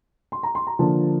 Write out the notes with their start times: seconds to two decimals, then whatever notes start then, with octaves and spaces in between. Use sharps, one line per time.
0.32 C6
0.43 A#5
0.55 C6
0.67 A#5
0.79 D3 F3 A#3 A5